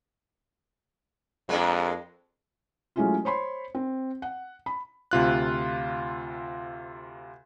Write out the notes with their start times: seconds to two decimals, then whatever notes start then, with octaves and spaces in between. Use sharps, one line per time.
1.49 F2 G#3 A#3 D4
2.96 F#3 G#3 A3 C#4 E4 F4
3.25 C5 C#5 B5 C6
3.75 C4
4.22 F#5
4.66 B5
5.11 D2 C3 F4 F#6